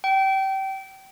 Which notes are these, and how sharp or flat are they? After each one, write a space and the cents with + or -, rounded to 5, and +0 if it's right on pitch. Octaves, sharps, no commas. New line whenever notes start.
G5 -25